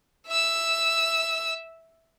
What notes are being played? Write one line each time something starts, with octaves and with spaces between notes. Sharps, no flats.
E5 E6